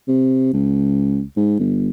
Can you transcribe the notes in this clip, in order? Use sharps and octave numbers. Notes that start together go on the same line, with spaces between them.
C3
C#2
G#2
G1